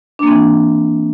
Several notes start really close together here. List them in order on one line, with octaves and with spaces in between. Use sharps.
D4 A#3 C4 E3